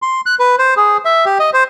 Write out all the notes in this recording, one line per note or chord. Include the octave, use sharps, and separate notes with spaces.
C6
F#6
B4
C5
G#4
E5
G4
D#5
C5